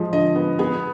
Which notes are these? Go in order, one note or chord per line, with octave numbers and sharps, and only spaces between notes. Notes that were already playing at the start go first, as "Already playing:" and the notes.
Already playing: F3 G#3
D3 D#5
B3
B3 G#4